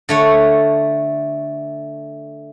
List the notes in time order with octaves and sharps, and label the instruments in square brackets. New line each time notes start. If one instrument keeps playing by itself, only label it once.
[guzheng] D3 A3 C#5